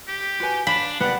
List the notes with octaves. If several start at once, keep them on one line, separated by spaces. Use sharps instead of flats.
G4
F#4 B4 G#5
D4 F5 B5
B3 G4 D5 F#5